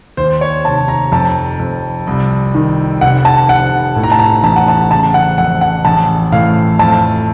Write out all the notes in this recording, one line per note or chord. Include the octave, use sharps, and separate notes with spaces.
D#2 C5
C#5
F1 A5
A#5
F2 A5
F2
C2
D#3
F1 F#5
A5
F1 F#5
A2
A#5
A5
A#5
A1 A5
F#5
A5
C#3 A5
F#5
F2 F#5
F#5
A1 A5
A2 F5
F2 A5